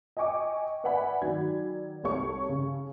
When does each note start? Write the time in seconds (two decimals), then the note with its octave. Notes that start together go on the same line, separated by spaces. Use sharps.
0.17 D#5 G5 G#5 C#6 D6
0.84 B4 D5 E5 F#5 G#5 B5
1.22 D#3 F#3 D5 G#6
2.04 C2 A4 C#5 C#6
2.49 C#3